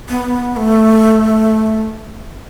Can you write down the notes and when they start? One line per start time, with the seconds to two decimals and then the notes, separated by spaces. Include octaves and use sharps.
0.09 B3
0.56 A3